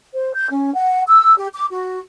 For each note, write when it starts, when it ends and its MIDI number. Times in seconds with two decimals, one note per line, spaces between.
0.15 0.33 72
0.35 0.47 91
0.50 0.74 61
0.75 1.02 78
1.08 1.35 88
1.38 1.47 67
1.53 1.67 86
1.70 2.00 66